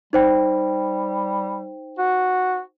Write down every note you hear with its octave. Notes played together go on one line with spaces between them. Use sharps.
G3 D#4 C5 G5
F#4